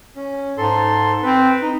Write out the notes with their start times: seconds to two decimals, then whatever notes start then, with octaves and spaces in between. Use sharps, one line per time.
0.16 C#4
0.58 G#2 A4 C6
1.23 C4 B4
1.62 D#4